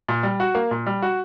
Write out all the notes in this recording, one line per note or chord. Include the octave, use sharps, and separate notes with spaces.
A#2
G3
F#4
A#3
A#2
G3
F#4